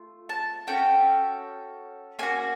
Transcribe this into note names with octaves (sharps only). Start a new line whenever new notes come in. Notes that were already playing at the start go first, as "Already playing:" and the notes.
Already playing: A3 F4
A5
C#4 F#4 A4 G5
A#3 C#4 F#4 G#5